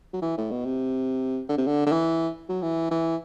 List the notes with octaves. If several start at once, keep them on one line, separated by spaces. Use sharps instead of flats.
F#3
E3
A2
B2
C3
D3
C3
D3
D3
E3
F#3
E3
E3